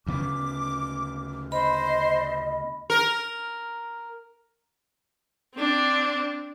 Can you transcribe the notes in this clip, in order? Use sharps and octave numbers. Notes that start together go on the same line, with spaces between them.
D2 C#3 B3 D6
C5 D#5 B5
A#4
C4 D4